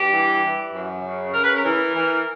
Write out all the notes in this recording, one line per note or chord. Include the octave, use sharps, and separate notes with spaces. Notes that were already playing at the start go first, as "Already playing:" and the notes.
Already playing: G2 G4
E3
E3
F#2
C#3
C#3 A#4
B4
A#4
E3
E3